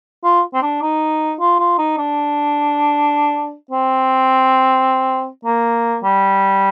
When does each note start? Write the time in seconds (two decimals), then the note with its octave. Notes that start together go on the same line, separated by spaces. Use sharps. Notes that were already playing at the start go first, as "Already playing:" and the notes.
0.24 F4
0.54 C4
0.62 D4
0.81 D#4
1.40 F4
1.59 F4
1.78 D#4
1.98 D4
3.71 C4
5.45 A#3
6.03 G3